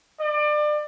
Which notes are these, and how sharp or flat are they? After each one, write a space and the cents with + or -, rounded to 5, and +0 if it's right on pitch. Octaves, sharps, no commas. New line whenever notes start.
D5 +30